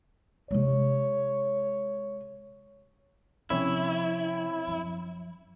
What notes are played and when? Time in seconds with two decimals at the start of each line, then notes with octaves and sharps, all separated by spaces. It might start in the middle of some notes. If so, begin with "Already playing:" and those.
0.51 C3 G#3 C#5
3.50 C3 F3 C4 C#4 E4 C#5
4.67 F#2 F3